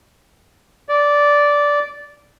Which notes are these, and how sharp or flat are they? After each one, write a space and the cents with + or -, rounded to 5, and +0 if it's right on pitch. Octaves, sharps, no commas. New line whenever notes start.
D5 -10